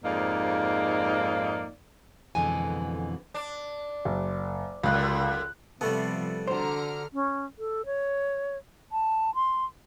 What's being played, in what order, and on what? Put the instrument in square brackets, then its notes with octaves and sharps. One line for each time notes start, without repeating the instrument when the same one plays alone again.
[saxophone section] F2 G#2 A#3 D#4 D5 F5
[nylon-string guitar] F2 B2 D3 E3 G#3 G#5
[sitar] D4
[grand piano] F#1
[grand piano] C#2 F#6 [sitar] F#2 D3
[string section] C3 F3 [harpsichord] G3 A3 B3 [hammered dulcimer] A4
[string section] D3 A#5 F6 [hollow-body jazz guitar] F#4 C5
[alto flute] C#4
A4
C#5
A5
C6